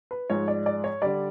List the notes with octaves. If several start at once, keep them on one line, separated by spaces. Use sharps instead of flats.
B4
G#2 F3 G#3 C#5
D5
D5
C#5
D3 G3 D5